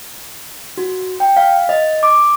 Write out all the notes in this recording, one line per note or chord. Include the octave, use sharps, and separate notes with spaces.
F#4
G5
F5
D#5
D6